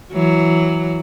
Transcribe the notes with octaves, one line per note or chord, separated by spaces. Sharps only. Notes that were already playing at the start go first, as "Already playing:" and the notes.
E3 F#3